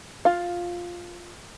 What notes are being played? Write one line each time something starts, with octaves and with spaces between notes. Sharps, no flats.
F4 F5